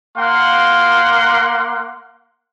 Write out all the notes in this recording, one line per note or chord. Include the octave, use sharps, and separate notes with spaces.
A#3 F5 F#5 C6